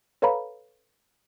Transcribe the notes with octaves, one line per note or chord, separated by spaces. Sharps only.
A4 B4 C#5 F5 A#5 B5